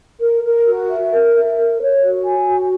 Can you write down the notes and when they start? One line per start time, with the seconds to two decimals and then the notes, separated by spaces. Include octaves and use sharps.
0.20 A#4
0.43 A#4
0.66 F#4
0.89 E5
1.11 A#4
1.34 E5
1.56 A#4
1.80 C#5
2.03 F#4
2.25 G#5
2.48 F#4